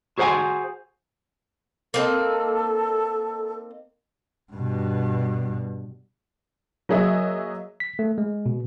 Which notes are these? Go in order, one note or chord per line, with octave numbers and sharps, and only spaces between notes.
F#4 G#4 C5 F5 F#5 G#5
A#3 C4 D#4 A4
G2 B2
F#3 A#3 G#4 D#5 E5
B6
A3
G#3
B2